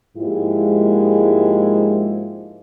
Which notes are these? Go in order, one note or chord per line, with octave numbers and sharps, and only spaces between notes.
G#2 F3 G#3 A#3 E4 G4